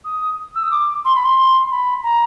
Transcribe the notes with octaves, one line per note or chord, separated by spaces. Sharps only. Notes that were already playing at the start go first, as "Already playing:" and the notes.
D#6
E6
D#6
D6
C6
B5
C6
B5
A#5